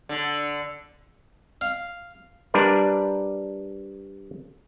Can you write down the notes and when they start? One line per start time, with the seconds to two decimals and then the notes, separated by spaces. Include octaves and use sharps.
0.09 D3
1.61 F5
2.54 G3 D4 A#4 B4 D5